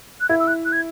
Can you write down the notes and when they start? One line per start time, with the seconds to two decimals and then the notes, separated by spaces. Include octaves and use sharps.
0.21 F#6
0.29 E4 G#6
0.40 E6
0.48 F#6
0.65 F#6
0.73 G#6